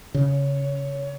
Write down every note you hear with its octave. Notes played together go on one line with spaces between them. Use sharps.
C#3 C#5